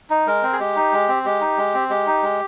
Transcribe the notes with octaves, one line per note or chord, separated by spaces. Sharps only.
D#4
G#3 A#4
C4
G#4
G#3 G4
D#4
G#3
C4
G#3 G4
D#4
G#3
C4
G#3 G4
D#4
G#3